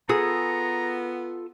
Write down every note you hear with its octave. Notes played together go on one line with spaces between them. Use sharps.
B3 F4 G#4 A4 A#5 D#6